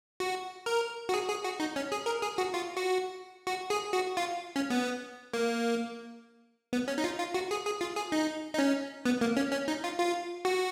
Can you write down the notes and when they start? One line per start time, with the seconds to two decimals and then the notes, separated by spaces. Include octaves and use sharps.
0.20 F#4
0.66 A#4
1.09 F#4
1.14 G#4
1.29 G#4
1.44 F#4
1.60 D#4
1.76 C#4
1.92 G#4
2.06 A#4
2.22 G#4
2.38 F#4
2.54 F4
2.77 F#4
3.47 F#4
3.70 G#4
3.93 F#4
4.17 F4
4.56 C#4
4.70 B3
5.33 A#3
6.73 B3
6.88 C#4
6.98 D#4
7.04 F4
7.19 F4
7.34 F#4
7.51 G#4
7.65 G#4
7.81 F4
7.96 G#4
8.12 D#4
8.54 D#4
8.59 C#4
9.05 B3
9.21 A#3
9.37 C#4
9.52 C#4
9.68 D#4
9.84 F4
9.99 F4
10.45 F#4